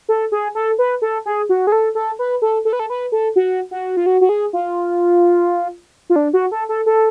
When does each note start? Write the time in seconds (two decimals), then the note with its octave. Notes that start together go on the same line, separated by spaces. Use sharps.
0.09 A4
0.32 G#4
0.55 A4
0.79 B4
1.02 A4
1.26 G#4
1.49 F#4
1.67 G#4
1.72 A4
1.95 A4
2.19 B4
2.42 A4
2.65 A4
2.73 B4
2.79 A4
2.90 B4
3.12 A4
3.36 F#4
3.71 F#4
3.97 F4
4.06 F#4
4.21 F#4
4.29 G#4
4.53 F4
6.10 F4
6.16 D4
6.33 F#4
6.52 A4
6.69 A4
6.86 A4